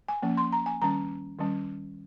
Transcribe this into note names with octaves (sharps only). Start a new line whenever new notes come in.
G#5
F3 A#3 C#4
C6
A#5
G#5
D#3 G3 C#4 A#5
D#3 G3 C#4